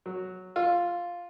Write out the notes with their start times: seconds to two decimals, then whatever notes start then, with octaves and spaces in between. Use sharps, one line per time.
0.06 F#3
0.56 F4